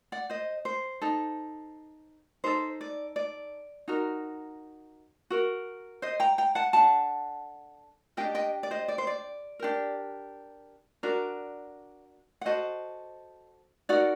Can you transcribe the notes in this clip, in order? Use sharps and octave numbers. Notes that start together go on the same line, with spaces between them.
D5 F#5
C5 D#5
C5
D#4 A4
D#4 A4 C5
D5
D5
D#4 F#4 A#4
F#4 A#4
C5 D#5
G5 A#5
G5 A#5
F#5 A5
D4 A4 F#5 A5
D4 G4 A#4 D#5 G5
D#5 G5
D5
C5 D#5
D5
C5
D5
D4 G4 A#4
D4 F#4 A#4 D5
F#5
F#4 A4 C5 D#5
D#4 F#4 A#4 D5 F#5